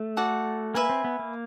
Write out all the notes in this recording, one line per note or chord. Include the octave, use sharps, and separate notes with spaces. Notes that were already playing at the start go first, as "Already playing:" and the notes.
Already playing: A3
F#4 A4 D5 F#5
A#3 B4 E5 G#5
C4
B3
A#3